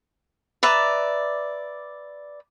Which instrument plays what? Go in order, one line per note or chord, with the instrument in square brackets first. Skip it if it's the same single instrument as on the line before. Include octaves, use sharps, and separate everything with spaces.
[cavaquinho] B4 D5 E5 A#5